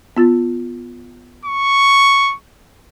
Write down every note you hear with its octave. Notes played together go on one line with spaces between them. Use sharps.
B3 F4 A6
C#6